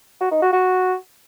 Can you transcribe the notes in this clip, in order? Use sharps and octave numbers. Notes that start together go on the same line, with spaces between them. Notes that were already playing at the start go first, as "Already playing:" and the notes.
F#4
D#4
F#4
F#4